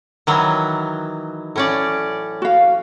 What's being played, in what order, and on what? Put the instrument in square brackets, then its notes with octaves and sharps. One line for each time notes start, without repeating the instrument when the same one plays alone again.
[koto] D#3 E3 F#3
A2 C#4 D5
[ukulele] F#4 F5